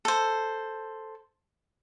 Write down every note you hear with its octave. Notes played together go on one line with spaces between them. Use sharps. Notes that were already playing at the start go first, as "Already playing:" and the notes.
A4 C5